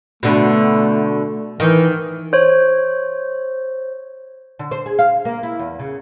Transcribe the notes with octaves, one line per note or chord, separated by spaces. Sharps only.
B2 D3 A3
D#3 E3
C5 C#5
D3
C5
G#4
F5
A#3
E4
E2
C#3